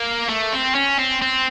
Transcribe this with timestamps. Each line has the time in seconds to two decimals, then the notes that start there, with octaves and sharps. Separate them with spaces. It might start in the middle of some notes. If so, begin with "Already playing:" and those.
Already playing: A#3
0.29 A3
0.53 C4
0.75 C#4
0.99 C4
1.22 C4